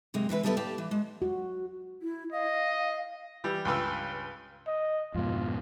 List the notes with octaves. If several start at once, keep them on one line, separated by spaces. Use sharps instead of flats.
F#2 C3 G#3 A#3
E3 G#3 E4 B4
D#2 G3 B3 E4 A4 B4
G4 D5 F5 G5 A5
E3
G#3
F#4
E4
D#5 F5
E3 G3
C#2 G2 B4 E6
D#5
F2 G#2 B2 F4